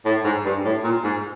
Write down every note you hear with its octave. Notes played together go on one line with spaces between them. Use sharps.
A2
G#2
G2
A2
A#2
G#2